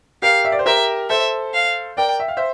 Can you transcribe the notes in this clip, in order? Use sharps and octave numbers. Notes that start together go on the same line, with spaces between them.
G4 A#4 F5
E5
D5
C5
G4 A#4 E5
A4 C5 E5
F5
A#4 D5 G5
E5
F5
C5 E5